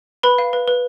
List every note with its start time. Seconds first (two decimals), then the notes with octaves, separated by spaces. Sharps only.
0.23 B4 B5
0.38 F5
0.53 B4
0.68 B4